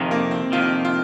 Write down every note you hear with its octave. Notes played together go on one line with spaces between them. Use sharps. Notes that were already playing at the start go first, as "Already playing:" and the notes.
Already playing: F2 C3 D#3
A#3
C4
F2 C3 D#3 F4
F4